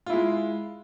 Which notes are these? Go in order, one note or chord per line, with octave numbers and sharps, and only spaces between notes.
G#3 E4 F4